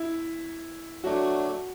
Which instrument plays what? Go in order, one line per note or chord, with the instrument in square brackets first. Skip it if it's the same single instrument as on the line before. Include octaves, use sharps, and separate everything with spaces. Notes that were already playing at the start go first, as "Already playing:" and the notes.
Already playing: [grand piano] E4
[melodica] F#3 A3 D4 [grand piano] F#4